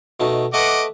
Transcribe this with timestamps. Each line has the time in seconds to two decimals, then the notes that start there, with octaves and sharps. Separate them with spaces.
0.20 B2 A3 D#4
0.54 A3 B4 D#5 F#5 D6